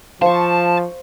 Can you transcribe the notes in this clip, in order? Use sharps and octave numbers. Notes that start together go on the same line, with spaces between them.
F3 C5 F5 A5 C#6